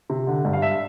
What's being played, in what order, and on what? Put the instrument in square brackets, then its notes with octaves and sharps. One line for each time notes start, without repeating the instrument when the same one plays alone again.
[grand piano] C3
D3
G2
F5
E5